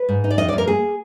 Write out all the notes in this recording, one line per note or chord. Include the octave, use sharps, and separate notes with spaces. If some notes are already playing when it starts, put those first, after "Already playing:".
Already playing: B4
G#2
D#4
D5
F2 D#5
D5
F2
A#4
A#3 G#4